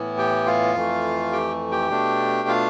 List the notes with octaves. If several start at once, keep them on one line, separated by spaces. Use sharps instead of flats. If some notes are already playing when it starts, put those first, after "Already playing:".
Already playing: A2 E3 B3 E4
G4 G5
F4 F5
F2 E3 A3
G4 G5
G4 G5
B2 A3 D4
F4 F5